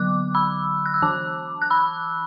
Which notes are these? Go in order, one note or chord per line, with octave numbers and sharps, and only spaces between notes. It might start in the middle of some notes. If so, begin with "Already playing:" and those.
Already playing: D3 F#3 B3 D6 F#6
B5 E6
F#6
E6
E3 D4 A5 D6
F#6
B5 E6